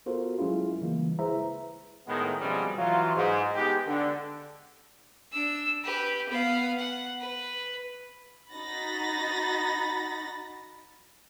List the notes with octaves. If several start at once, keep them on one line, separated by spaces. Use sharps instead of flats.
B3 F4 F#4 A4 A#4 C5
F#3 G#3 C#4 E4 F4 G#4
C#3 E3 G3 G#3 A#3
E4 G#4 B4 C5 E5 A#5
A2 D#3 G#3 A3 B3
B2 F3 G3 G#3 C4 C#4
E3 F#3 F4
G#2
G#3 B3 D#4 G4
D3
D4 E6
G4 B4
B3 F5
F#5
B4
D#4 F#4 B5 A6 A#6